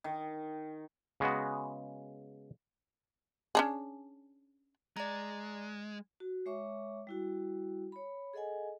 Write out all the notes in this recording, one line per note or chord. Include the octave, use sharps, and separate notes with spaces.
D#3
C#3 G#3 B3 F#4
C#4 D4 G#4
G#3 D5 A#5
F#4
G#3 C#5 E5 C#6 D6
G3 E4 F#4
C#5 B5
G#4 A4 D#5 F#5 G#5